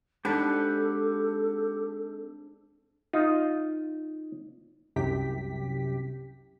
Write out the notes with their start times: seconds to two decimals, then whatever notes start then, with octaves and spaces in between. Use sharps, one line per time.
0.25 G#3 C4 D4 D#4 G4 A4 F#5 B5
3.13 D#4 F4
4.96 C2 F#2 C3 G4 G5 B6